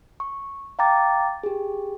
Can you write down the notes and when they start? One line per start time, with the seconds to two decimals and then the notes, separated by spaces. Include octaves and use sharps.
0.20 C#6
0.79 F5 G5 A#5 D6 A6
1.43 G4 G#4